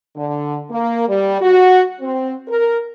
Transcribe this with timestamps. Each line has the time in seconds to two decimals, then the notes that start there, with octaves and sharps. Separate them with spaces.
0.16 D3
0.71 A#3
1.09 G3
1.41 F#4
2.01 C4
2.49 A#4